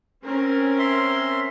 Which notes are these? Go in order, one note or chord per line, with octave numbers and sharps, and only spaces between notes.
C4 C#4 A#4
E5 C6